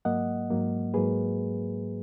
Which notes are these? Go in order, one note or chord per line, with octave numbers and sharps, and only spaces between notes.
G#2 F#3 A#3 D#5 F#5
G#2 F#3 A#3
G#2 F#3 A#3 G#4 B4